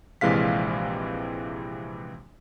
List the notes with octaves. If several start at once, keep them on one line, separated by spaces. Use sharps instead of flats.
A#1 C3 E3 G#3 F5 B6